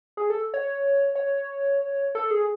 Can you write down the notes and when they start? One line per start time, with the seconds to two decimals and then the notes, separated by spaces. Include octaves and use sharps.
0.17 G#4
0.30 A4
0.54 C#5
1.15 C#5
2.15 A4
2.31 G#4